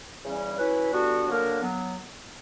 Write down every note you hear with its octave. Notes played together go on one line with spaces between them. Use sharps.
E2 C#3 G3 C#4
F#3 C#4 E4 B4
D3 G3 B3 D4 F#4
D3 F#3 A#3 D4 A#4
F#3 B3